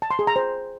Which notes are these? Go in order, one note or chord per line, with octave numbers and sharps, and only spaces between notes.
A5
C6
G#4
A#5
C5